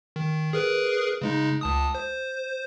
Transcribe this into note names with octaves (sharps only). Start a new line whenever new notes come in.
D#3
G#4 A#4 B4
C#3 G#3 D#4
C#2 A5 D#6
C5